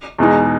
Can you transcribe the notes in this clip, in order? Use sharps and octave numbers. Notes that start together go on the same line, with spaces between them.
E2 B2 G#3 D#4